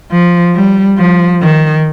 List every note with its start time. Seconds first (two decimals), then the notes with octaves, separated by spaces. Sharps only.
0.12 F3
0.55 G3
0.98 F3
1.42 D#3